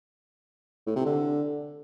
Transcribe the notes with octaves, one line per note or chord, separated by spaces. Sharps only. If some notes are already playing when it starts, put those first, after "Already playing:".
A2
C3
D3